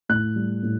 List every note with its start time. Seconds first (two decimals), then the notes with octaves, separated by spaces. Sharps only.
0.09 A2 F#6
0.36 G3
0.63 A2